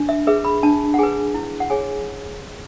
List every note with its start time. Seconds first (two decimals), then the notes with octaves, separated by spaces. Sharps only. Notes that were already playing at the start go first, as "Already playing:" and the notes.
Already playing: D4
0.09 E5
0.27 G#4 B4 E5
0.45 B5
0.63 D4 A5
0.94 F#5
0.99 G#4 B4 G#5
1.34 E4
1.60 F#5
1.70 G#4 C#5 G#5